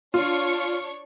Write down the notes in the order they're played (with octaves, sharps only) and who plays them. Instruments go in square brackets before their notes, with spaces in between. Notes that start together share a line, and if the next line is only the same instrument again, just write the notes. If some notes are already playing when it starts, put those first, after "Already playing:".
[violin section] D4 C#5 C#6 [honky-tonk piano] F4